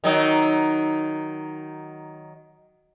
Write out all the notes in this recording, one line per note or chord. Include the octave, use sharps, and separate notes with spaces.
D#3 F#3 D#4